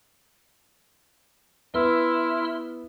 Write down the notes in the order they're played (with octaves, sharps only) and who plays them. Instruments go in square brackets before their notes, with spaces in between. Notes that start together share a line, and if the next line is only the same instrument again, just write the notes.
[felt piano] B3 [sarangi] E4 [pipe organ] C6 E6 F6